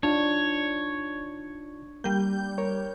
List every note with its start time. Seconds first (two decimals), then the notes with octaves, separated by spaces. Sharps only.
0.03 D4 D#4 F4 C#5 A5
2.04 G3 A#3 G6
2.58 A#4 C#5